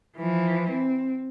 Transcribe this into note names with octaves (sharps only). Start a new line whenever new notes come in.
E3 F3
C4